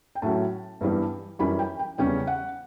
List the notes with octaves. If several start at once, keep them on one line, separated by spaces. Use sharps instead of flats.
G5
A2 F#3 A3 C#4 A5
G2 E3 G3 B3
F#2 E3 G3 C#4 B5
G5
G5
E2 C#3 G3 C#4 G5
F#5